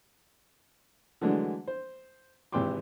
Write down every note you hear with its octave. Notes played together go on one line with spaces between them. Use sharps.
D3 E3 F#3 G#3 A3 D4
C5
G#1 C3 E3 G5 C6 D6